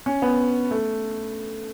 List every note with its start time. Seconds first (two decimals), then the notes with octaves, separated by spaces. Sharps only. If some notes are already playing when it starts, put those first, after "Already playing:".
0.06 C#4
0.22 B3
0.71 A3